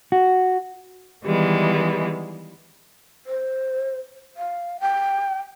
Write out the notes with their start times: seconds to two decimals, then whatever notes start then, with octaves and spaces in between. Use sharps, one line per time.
0.12 F#4
1.25 D#3 E3 G3 G#3 B3
3.26 C5
4.37 F5
4.80 G5